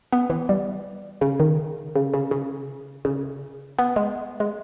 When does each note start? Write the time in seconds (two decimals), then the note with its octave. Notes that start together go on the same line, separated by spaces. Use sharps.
0.12 B3
0.30 E3
0.49 G3
1.21 C#3
1.40 D#3
1.96 C#3
2.14 C#3
2.31 C#3
3.05 C#3
3.79 B3
3.96 G#3
4.40 G#3